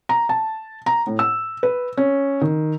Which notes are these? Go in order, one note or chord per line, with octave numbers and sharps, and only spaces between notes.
A#5
A5
A#5
A2
E6
B4
C#4
D#3